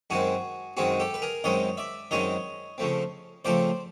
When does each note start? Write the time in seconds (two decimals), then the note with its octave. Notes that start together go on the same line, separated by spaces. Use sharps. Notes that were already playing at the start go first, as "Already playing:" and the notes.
0.10 F#2 D#3 G#3 C4 F#4 G#4
0.77 F#2 D#3 G#3 C4 F#4 G#4
1.00 G4 A4
1.14 B4
1.22 G#4 A#4
1.44 F#2 D#3 G#3 C4 C#5 D#5
1.77 D5 E5
2.11 F#2 D#3 G#3 C4 C#5 D#5
2.78 C#3 F3 A3 C4
3.45 C#3 F3 A3 C4 C5 D5